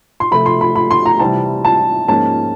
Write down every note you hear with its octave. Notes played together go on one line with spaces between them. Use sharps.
C6
C3 F3 A3 B5
C6
B5
B5
C6
A#5
C3 E3 G3 C4 A5
A5
G#2 F3 A#3 C#4 A5